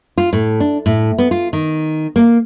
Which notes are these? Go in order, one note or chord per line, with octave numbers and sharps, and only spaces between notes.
F4
A2
D4
A2
B3
F4
D#3
A#3